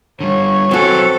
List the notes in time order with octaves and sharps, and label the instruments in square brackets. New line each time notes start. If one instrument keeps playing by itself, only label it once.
[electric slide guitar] D3 G3 [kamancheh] C#5
[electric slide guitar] F#3 B4 G#5 [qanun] C4 F#4 [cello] A4